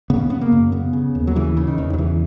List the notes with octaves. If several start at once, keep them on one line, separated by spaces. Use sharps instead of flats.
C#3 B3
C#4
C#3 B3
A#3
F#2
C#3 B3
C#3
D#2
F#3
C#3 E3
C#3
D#3
E2
F#3
C#3 E3